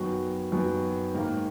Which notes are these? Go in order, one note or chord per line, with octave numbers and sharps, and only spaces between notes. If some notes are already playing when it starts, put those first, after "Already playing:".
Already playing: F#2 D#3 F#3 B3 F#4
F#2 D#3 F#3 B3 F#4
G#2 D#3 A#3